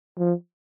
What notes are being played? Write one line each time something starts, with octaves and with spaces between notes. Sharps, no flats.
F3